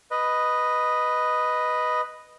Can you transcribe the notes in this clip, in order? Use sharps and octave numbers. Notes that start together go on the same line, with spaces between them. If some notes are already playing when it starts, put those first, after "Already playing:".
B4 D#5